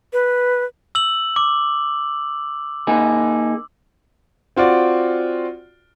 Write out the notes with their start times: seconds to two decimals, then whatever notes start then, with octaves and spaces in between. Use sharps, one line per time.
0.13 B4
0.95 E6 F#7
1.36 D6
2.87 A#3 D#4 G#4
4.56 C4 F4 F#4 D5